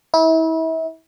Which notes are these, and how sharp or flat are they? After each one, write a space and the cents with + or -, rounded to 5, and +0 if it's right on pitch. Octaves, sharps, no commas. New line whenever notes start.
E4 -35